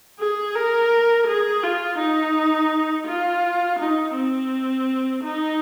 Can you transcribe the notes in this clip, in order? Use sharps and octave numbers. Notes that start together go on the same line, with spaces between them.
G#4
A#4
G#4
F4
D#4
F4
D#4
C4
D#4